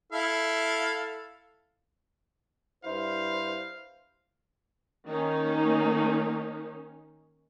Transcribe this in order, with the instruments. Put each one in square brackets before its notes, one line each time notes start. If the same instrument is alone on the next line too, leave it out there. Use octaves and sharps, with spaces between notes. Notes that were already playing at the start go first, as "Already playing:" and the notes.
[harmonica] E4 A4 F5
[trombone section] G2 E4 [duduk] C5 [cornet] F5
[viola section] D#3 A#3 C#4 D#4